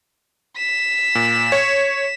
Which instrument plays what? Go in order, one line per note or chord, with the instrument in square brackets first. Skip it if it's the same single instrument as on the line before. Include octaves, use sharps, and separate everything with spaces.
[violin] B6 E7
[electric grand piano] A#2
C#5